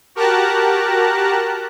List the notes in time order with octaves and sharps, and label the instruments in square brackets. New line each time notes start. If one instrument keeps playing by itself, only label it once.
[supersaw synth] F#4 G4 A#4 A5 A#5 F#6